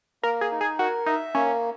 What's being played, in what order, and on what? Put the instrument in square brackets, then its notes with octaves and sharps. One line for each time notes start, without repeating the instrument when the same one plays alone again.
[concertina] A#3 [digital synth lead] A#4
[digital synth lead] G#4
[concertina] D#4
[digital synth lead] G#4
[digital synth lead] F#4 [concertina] A#4
[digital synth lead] D#4 [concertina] E5
[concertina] A#3 [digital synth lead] C#4